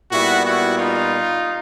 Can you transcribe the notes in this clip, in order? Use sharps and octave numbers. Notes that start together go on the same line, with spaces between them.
A#2 G3 B3 E4 F#4
E4 F#4
D#4 F4